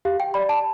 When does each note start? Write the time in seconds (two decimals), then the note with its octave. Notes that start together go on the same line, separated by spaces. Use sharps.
0.05 G4 F5
0.20 G5
0.34 D5 B5
0.49 A5